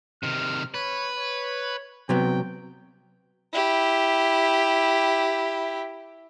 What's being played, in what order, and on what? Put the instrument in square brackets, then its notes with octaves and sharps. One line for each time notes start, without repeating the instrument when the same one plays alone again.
[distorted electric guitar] C3 D#3 [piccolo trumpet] F6
[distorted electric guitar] B4 [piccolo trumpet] C#5
[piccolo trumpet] C#5
[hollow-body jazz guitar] C3 F#3 B3 [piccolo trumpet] G5
[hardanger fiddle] E4 G4